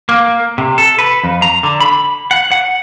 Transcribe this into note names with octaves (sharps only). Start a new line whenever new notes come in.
A#3
C3
A4
B4
F2
A#5
D3
B5
F#5
F#5